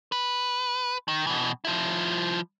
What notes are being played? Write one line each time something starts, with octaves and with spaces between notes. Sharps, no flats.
B4
D#3
B2 E3
F3 E4